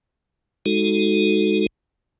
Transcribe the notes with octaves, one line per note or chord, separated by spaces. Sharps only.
G#3 D#4 F#4 A4